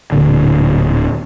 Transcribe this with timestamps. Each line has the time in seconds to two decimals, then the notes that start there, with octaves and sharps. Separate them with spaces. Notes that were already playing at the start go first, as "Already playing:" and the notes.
0.12 D1 A#2 D3